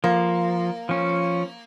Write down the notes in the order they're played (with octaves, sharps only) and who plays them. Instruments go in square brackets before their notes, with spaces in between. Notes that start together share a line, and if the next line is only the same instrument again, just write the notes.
[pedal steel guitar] F3 [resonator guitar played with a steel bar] A#3
[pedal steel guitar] F3 C#4